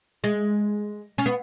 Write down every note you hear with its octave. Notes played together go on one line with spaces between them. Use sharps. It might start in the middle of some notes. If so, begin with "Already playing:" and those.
G#3
C#4
B3